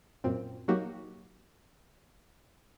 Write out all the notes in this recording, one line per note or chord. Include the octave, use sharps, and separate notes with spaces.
F#2 A#2 C4
F#3 A#3 D#4 F#4 G4